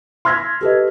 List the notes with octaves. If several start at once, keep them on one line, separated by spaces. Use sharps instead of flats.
C6 E6 F6 G#6 A#6 B6
G4 A4 B4 D#5